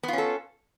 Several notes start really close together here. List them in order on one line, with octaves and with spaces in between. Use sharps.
B3 F4 C#4 A4